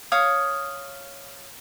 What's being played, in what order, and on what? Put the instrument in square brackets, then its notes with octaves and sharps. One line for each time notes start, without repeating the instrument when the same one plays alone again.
[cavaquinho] C#5 F5 D#6